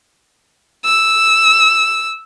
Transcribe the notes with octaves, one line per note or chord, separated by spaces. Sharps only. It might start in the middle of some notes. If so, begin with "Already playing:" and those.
E6